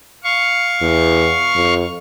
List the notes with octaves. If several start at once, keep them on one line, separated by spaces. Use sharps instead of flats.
F5 C#6
E2
F2